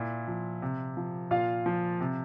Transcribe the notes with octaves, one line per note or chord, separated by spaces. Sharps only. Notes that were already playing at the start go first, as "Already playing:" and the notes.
Already playing: A#2 E4
F3
C3
F3
A#2 F4 F5
F3
C3